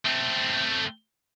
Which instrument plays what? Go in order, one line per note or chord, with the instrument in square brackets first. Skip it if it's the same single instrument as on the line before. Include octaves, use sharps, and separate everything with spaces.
[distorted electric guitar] A3 C4